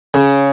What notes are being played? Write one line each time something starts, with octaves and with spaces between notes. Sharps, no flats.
C#3